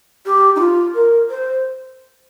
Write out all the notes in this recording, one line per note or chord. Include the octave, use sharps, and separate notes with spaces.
G4
D#4
F4
A#4
C5